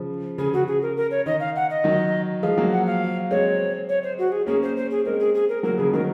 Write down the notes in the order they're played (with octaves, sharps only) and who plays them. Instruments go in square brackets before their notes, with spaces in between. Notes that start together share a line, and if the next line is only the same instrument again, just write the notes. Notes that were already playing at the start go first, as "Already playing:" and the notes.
Already playing: [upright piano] C#3 F3
[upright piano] C#3 [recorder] G#4
[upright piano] C#3 [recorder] F#4
[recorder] G#4
A#4
A#4
C#5
[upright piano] D#3 [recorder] D#5
[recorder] F5
F#5
D#5
[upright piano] D#3 F#3
[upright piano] F3 G#3 [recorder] F5
[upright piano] F#3 A#3
[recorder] F#5
F5
[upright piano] G#3 C4 [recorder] C#5
[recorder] C#5
C5
F#4
G#4
[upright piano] A#3 C#4 [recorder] G#4
[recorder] C5
C5
G#4
[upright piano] G#3 C4 [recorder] A#4
[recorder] G#4
G#4
A#4
[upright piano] F#3 A#3 [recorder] A#4
[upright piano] C#3 F3 [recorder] G#4
[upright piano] D#3 F#3 [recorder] A#4